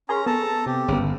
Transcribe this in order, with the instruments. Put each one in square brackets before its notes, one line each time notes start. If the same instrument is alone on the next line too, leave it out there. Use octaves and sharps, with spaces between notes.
[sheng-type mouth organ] C#4 A#5 [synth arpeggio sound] G#4 A#4 C6
[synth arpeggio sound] B3 [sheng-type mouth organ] A4 A5 A#5
[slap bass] C3 [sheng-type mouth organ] G4
[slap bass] G1 [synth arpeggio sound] C#3 B3